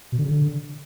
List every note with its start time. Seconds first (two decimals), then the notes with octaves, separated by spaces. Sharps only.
0.12 B2
0.18 D3
0.25 C#3
0.31 D3